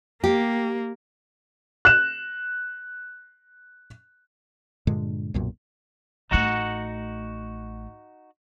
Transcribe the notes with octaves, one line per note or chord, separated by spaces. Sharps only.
A#3 G4
F#6 E7
G2 A#2 D3 G#3
B1 F#2 A#2
A1 A3 D#4 F#4 F#5